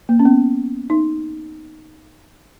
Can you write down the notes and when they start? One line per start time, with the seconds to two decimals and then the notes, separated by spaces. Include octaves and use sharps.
0.09 A#3
0.19 C#4
0.25 B3
0.90 D#4